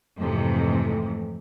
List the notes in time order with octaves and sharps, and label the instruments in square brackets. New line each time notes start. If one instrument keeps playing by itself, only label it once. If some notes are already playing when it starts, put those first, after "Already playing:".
[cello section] F2 G#2 C3 E3 A3